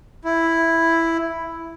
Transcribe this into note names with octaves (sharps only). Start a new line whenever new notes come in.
E4